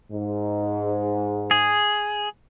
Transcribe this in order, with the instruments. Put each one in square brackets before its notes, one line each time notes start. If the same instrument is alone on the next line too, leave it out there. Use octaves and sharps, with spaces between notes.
[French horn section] G#2
[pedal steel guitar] G#4